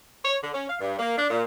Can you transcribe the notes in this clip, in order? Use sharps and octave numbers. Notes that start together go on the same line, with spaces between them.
C#5
D3
C#4
F5
G2
A#3
D4
A#2